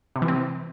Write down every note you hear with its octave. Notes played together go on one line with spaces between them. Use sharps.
C3
E3
C4